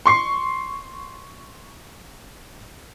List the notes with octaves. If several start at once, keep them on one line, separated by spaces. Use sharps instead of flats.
C6 C#6 C7